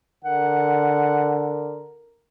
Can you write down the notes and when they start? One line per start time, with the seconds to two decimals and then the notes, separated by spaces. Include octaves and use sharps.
0.25 D3 A#4 F#5